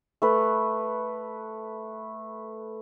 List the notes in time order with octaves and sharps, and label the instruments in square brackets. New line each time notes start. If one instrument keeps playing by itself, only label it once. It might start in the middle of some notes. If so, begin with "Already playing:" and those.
[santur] A3 B4